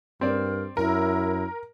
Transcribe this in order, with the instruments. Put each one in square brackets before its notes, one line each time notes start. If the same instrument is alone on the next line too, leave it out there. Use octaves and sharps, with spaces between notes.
[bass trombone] G2 [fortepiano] C4 D5 [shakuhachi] A#4
[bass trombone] F#2 [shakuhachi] E4 [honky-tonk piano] A#4